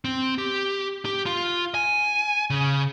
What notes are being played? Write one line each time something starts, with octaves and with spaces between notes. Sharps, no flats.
C4
G4
G4
F4
G#5
C#3